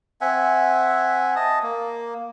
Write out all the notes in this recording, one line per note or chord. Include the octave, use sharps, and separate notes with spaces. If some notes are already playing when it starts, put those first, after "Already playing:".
C4 E5 F#5 G#5
D#5 A5 D#6
A#3